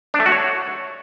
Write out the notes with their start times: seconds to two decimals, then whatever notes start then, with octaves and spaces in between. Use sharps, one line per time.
0.14 D4
0.20 A3
0.26 F#4
0.32 C#5